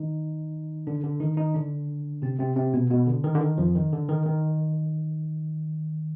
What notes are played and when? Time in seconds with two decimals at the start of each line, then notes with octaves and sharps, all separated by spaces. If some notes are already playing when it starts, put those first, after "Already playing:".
Already playing: D#3 D#4
0.87 D3 D4
1.03 D3 D4
1.20 D#3 D#4
1.37 D#3 D#4
1.54 D3 D4
2.22 C3 C4
2.39 C3 C4
2.56 C3 C4
2.74 B2 B3
2.90 B2 B3
3.07 D3
3.24 D#3
3.35 D3
3.41 D#3
3.58 F2 F3
3.75 D#3
3.92 D3
4.09 D#3
4.26 D#3